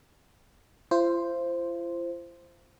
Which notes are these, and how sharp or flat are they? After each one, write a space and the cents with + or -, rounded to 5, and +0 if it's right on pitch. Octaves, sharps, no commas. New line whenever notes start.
F4 -45 C5 +0